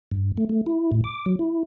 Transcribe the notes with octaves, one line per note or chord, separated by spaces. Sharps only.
G2
A3
A3
E4
A2
D6
F#3
E4